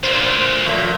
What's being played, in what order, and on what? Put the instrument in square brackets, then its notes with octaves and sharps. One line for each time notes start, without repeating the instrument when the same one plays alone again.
[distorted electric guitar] D2 [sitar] A#2 C5
[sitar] A#2 F3 A3